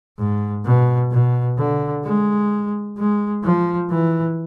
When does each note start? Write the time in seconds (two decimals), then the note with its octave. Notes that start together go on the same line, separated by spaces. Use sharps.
0.18 G#2
0.65 B2
1.11 B2
1.58 D3
2.04 G#3
2.97 G#3
3.43 F3
3.90 E3